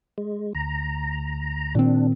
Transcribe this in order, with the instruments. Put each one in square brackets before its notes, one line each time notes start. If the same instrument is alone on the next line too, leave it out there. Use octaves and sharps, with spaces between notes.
[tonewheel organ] G#3
D2 A#5
[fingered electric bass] A#2 D#3 C4 [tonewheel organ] D4